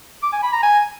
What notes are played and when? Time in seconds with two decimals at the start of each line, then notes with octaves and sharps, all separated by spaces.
0.23 D6
0.33 G#5
0.43 B5
0.53 A#5
0.63 G#5